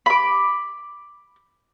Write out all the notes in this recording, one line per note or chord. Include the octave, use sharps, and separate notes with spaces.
B5 D6